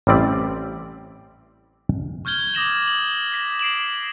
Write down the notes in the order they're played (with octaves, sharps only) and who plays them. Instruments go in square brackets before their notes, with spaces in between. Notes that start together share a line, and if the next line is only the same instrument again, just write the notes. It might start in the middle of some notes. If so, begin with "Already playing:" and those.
[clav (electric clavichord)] A1 G3 C4 D5 E5
[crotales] C#6 F6 G6 G#6 G7
D6 D#6 A#6 E7 F#7
F#7
A#6 B6 E7
C7 D7 E7 F#7